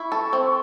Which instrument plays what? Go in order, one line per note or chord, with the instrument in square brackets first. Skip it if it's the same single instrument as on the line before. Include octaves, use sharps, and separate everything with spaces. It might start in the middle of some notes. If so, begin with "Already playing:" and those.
Already playing: [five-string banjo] E4 [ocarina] C#6
[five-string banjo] A4
C4